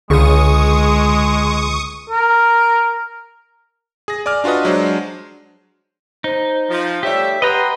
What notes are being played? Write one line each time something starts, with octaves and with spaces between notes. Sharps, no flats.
C#2 D3 G#3 G#4 C#6 D#6
A#4
G#4 A#6
D5 G#5 D6 F6
D4 F4 F#4 B4 D#5
F#3 G#3 D4 C5
D#4 C5
F3
G3 A3 G4 C#5 E5
G4 B4 D#5 F#5 G5 A#5 C6 D#6